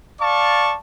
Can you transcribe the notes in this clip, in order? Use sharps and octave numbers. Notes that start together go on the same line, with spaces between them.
D5 F5 A5 C#6